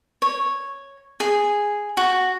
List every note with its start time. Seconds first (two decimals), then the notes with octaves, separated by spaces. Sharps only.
0.22 C#5
1.20 G#4
1.97 F#4